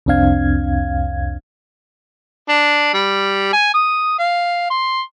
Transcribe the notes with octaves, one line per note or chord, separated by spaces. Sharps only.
C2 F2 C4 D4 F5 G#6
D4
G3
G#5
D#6
F5
C6